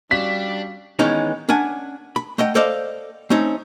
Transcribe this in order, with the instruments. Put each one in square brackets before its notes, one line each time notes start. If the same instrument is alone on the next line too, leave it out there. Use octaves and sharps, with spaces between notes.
[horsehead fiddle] G3 [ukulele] C#4 F#4 F5 [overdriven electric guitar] D4 [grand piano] B6
[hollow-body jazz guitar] D#3 E3 G#3 B3 C#4 D#4
C#4 D4 F#5 G#5
B5
A3 D#5 F#5 G5
A4 C5 D5 D#5 F5
A3 C4 C#4 D#4